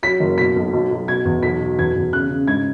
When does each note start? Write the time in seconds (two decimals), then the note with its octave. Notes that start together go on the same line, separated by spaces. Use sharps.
0.03 F#3 B6
0.20 F#1
0.38 B2 B6
0.56 B1
0.73 B1
0.91 B1
1.08 B2 G#6
1.25 E2
1.43 B1 B6
1.60 B2
1.79 E2 G#6
1.96 E2
2.13 C#3 F#6
2.30 C#3
2.48 G#2 G#6